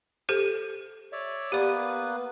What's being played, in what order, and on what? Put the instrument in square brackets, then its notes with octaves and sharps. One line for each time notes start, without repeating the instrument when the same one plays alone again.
[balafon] G4 A4 C5
[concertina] C#5 D5 E5
[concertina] A#3 B3 B4 [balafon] G4 D5